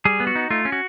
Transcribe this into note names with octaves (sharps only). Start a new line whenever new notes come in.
G3 G#4
B3
F#4
D#4
A3 F4
C#4
F#4